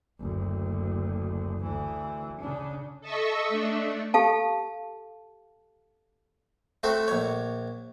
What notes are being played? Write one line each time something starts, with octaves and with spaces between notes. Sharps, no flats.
F#1 D2
D2 E3
C#3 D4
A4 D#5 E5 C#6 E6
A3 D4
G4 A4 F5 A5
A3 C4 F#4 A4
A#1 C#5